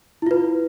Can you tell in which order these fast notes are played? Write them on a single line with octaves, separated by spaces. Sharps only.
E4 F4 B4